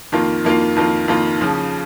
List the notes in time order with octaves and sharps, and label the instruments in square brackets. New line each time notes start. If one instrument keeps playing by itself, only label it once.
[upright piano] F2 D#3 A#3 F4
F2 D#3 A#3 F4
F2 D#3 A#3 F4
F2 D#3 A#3 F4
D#2 C#3 F3